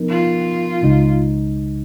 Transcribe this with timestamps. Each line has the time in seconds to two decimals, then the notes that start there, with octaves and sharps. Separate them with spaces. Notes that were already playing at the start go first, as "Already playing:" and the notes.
Already playing: F3 B3 D#4 A#4
0.09 F4
0.83 C#2 C#3 G#3 D#4